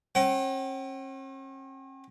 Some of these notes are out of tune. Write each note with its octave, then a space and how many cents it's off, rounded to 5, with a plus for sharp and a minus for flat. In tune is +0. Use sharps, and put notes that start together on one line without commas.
C#4 -45 G5 -45